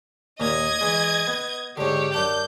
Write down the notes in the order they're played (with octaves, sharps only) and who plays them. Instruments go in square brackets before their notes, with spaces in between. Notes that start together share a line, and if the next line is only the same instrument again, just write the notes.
[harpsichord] D#2 A#2 [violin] D#5 G#6
[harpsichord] E3 G#3
B3
[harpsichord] G#2 D3 [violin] G4 C#5
[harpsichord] F#2 D4 [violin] G6